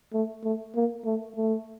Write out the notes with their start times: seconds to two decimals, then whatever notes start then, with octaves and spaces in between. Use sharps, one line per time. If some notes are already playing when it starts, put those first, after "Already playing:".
0.13 A3
0.44 A3
0.75 A#3
1.05 A3
1.36 A3